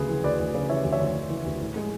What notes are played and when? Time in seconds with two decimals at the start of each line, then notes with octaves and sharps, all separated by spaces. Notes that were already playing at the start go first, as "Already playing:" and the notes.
Already playing: D2 C#3 G#4 B4
0.09 E3
0.24 D2 B4 D5
0.40 D2
0.54 C#3
0.69 E3 C#5 E5
0.84 D2
0.92 C#5 E5
1.00 D2
1.15 C#3
1.30 E3
1.46 D2
1.61 A2
1.76 G#3